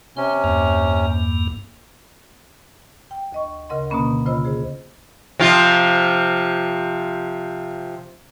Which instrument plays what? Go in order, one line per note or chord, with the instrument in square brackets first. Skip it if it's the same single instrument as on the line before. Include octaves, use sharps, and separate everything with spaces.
[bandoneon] C3 C#4 [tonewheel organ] C4
[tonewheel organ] E2 G2 A#3
[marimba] G5
D2 D#5 C#6
D2 C#3 A#4 D#5 F#5 C6
B2 D3 A#3 C#4 B5
C#3 F4 C5 D#5 B5 E6
G#4 C5
[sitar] C3 F3 F4